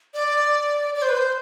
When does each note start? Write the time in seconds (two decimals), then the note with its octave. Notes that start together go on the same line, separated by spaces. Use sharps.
0.14 D5
0.95 D5
1.02 C5
1.09 B4
1.17 C5